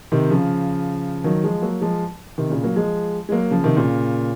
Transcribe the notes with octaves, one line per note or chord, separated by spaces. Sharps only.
C3 D#3
C#3 F3
D#3 F#3
F3 G#3
F#3 A#3
F3 G#3
C3 D#3
A#2 C#3
F#3 A#3
F3 G#3
G#3
F#3 A#3
C#3 F3
C3 D#3
A#2 C#3